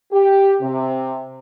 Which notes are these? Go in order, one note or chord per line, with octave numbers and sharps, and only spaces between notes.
G4
C3